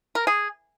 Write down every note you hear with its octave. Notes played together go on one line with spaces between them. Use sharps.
A#4
G#4